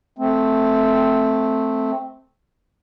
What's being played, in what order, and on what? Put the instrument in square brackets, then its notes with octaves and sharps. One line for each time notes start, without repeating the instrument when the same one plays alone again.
[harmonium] A3 C4